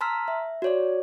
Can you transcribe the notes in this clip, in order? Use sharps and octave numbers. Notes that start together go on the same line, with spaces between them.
A5 A#5 C6 E6 F6 B6
E5
F#4 C#5 D5